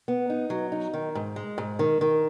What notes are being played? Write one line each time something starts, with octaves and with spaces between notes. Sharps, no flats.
B3
D#4
F#3
D#4
D#3
G#2
G#3
G#2
D#3
D#3